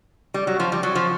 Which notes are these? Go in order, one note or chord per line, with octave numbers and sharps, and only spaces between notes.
G3
F#3
F3
G3
F#3
F3